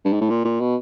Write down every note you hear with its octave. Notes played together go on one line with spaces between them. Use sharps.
G2
G#2
A2
A#2
A#2
B2